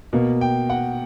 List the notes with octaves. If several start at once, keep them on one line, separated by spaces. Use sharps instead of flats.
B2 A#3
G5
F#5